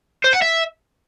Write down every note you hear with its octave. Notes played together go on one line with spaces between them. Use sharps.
C5
F#5
E5